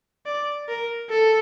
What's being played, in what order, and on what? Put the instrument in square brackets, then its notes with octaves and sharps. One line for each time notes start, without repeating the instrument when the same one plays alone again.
[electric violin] D5
A#4
A4